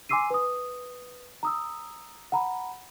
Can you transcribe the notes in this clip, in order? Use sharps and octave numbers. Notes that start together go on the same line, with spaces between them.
G#5 C6 D6 E6 C7 D#7
B4 D#6
A#5 D#6 E6
F#5 A#5 B5